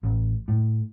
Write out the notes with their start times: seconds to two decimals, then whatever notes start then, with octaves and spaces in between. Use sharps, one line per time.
0.03 A1
0.48 A2